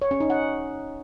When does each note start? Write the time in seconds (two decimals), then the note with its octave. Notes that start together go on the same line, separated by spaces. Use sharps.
0.02 C#5
0.11 C#4
0.20 D#4
0.30 F#5